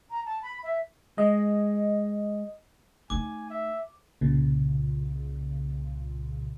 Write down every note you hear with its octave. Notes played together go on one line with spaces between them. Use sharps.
A#5
A5
B5
E5
G#3 D#5
A3 D#4 G#5 D6
E5
C2 A#2 C#3